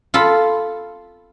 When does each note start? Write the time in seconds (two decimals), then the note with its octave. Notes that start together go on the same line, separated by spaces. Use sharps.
0.14 F4 A4 A5 B5